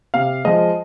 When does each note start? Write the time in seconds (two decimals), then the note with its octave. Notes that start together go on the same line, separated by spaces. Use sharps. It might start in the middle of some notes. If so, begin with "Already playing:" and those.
0.14 C3 F5
0.45 F3 G#3 D#5